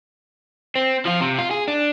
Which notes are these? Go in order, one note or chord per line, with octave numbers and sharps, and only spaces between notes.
C4
F3 F4
C3
F4
G#4
D4